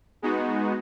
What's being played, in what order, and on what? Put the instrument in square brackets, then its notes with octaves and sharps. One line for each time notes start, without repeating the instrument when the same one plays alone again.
[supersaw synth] G#3 B3 D#4 F#4